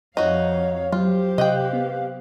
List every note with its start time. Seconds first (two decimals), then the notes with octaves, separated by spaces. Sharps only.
0.17 F2 D#4 F#4 C#5 F5
0.92 F#3 F4 G4 C5
1.38 C3 D#5 F5 G5 F#6
1.73 B3